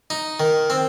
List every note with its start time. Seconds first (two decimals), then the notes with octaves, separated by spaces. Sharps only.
0.10 D#4
0.40 D#3
0.70 C4